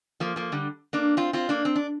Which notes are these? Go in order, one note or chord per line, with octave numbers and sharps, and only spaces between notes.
F3 A#3
F3 A#3
D3 G3
A#3 D4
C4 F4
C4 F4
A#3 D4
C4
D4